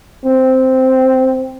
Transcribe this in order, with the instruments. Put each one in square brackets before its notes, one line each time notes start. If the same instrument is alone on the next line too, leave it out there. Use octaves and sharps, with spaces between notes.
[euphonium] C4